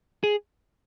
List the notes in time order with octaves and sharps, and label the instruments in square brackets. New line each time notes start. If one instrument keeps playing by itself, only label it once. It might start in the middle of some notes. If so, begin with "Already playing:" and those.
[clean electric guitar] G#4